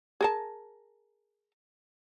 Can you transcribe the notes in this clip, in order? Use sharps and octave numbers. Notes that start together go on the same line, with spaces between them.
G#4 A#4 A5